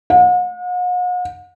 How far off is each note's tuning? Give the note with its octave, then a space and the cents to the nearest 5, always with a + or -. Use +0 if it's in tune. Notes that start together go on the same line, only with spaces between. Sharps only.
F#5 -45